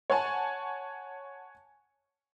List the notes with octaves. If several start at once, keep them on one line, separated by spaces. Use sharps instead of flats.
C#5 F#5 G#5 A5